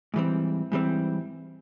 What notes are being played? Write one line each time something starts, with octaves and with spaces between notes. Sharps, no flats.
G#2 E3 G3 C4
G#2 E3 G3 C4